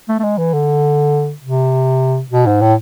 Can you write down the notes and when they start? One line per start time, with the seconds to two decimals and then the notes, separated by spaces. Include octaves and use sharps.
0.08 A3
0.19 A3
0.23 G#3
0.38 E3
0.53 D3
1.42 C3
2.31 B2
2.46 G#2
2.61 A2